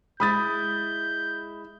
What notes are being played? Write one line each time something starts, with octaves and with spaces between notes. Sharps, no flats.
G#3 E4 B5 D#6 G6 A6